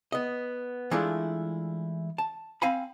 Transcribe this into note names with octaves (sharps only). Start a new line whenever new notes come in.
B3 D#5
E3 G#3 A3 D4 E4 F4
A5
C4 F5 G#5 B5